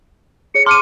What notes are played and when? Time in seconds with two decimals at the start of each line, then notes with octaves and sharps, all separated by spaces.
0.55 G#4 C#5 C#7
0.66 A5 C6 D6 F6 D#7